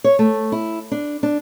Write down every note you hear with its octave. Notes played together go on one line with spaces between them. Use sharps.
C#5
A3
E4
D4
D4